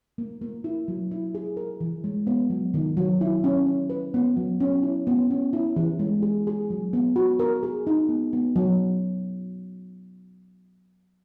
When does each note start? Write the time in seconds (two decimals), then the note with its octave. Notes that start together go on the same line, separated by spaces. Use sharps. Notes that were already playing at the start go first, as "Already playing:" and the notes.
0.18 A#3
0.42 A#3
0.64 E4
0.88 F#3
1.11 E4
1.35 G#4
1.57 A#4
1.81 E3
2.04 G#3
2.27 B3
2.50 F#3
2.74 D#3
2.97 F#3
3.21 E4
3.44 C#4
3.66 C#4
3.90 B4
4.14 B3
4.37 F#3
4.60 C#4
4.83 E4
5.07 B3
5.31 C#4
5.53 E4
5.76 E3
5.99 G#3
6.23 G#4
6.47 G#4
6.70 F#3
6.93 B3
7.16 F#4
7.40 A#4
7.63 G#4
7.87 D#4
8.09 B3
8.33 B3
8.56 F#3